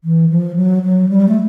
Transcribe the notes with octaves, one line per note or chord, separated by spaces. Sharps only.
E3
F3
F#3
F#3
G3
A3